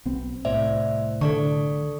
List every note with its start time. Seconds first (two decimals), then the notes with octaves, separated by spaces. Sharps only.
0.05 B1 B3 C4
0.45 C2 A2 C5 D5 E5
1.21 D3 A4 D5 C#6